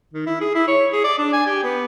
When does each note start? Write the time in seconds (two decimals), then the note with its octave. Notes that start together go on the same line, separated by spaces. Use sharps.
0.14 D#3
0.26 E4
0.41 G#4
0.55 E4
0.68 C#5
0.93 G#4
1.04 D5
1.18 D4
1.33 G#5
1.46 G4
1.64 B3